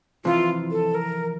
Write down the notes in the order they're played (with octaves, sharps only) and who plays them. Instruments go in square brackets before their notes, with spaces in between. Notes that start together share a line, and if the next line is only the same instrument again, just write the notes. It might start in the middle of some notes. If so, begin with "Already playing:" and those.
[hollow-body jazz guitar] F2 C3 E3 [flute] F4
[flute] A4
A#4